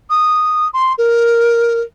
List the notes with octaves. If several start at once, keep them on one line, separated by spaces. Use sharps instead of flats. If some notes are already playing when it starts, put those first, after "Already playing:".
D#6
C6
A#4